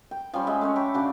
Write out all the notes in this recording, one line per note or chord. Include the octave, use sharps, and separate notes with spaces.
G5
F3 G3 C#4
G#3 E5
A3 C#4 C#5
G5 B5 C#6 D6
C#3 D4 F#4